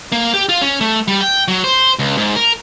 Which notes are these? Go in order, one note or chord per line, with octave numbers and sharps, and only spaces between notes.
A#3
G4
F4
C#4
A3
G3
G5
F#3
C5
C#2
G#2
A#4